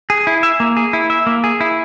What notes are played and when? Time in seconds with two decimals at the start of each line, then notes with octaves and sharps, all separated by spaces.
0.10 G#4
0.27 E4
0.43 E5
0.60 A#3
0.77 G#4
0.93 E4
1.10 E5
1.27 A#3
1.44 G#4
1.60 E4